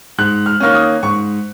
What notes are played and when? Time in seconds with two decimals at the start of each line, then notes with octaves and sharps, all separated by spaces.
0.18 G#2 F#6
0.46 F6
0.60 D#3 A#3 C#4 F6
0.75 D#6
1.03 G#2 C#6